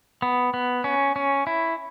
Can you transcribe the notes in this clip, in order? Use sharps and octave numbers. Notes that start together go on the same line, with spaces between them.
B3
B3
C#4
C#4
E4